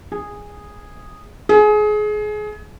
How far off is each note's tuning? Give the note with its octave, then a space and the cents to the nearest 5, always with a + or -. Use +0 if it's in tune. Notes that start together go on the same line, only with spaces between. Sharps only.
G#4 -10
G#4 +25